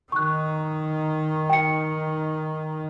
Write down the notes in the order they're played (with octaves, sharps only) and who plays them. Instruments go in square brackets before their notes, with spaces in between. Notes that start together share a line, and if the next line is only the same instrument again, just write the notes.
[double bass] D#3 D#4 [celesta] C#6 F#6
[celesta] G5 C#7